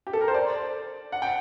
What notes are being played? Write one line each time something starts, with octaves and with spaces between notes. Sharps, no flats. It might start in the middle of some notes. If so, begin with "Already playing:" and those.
G4
A4
A#4
C5
D5
F#5
G5